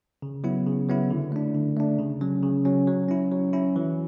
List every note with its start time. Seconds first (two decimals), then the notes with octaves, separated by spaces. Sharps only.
0.22 C#3
0.44 F#3 B3 E4
0.66 C#3
0.88 F#3 B3 E4
1.10 D3
1.32 A3 D4
1.54 D3
1.77 A3 D4
1.99 C#3
2.21 F#3 C#4
2.43 C#3
2.65 F#3 C#4
2.87 F#3
3.09 C#4 E4
3.32 F#3
3.53 C#4 E4
3.76 E3